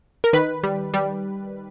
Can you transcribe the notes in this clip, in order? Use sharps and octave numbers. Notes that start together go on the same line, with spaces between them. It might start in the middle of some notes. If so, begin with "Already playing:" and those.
A#4
D#3 B4
G3
G3